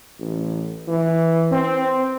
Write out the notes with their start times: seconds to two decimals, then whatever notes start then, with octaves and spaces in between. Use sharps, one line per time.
0.20 A1
0.88 E3
1.52 C4